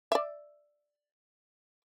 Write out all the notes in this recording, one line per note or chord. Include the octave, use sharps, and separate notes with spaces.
D5 E5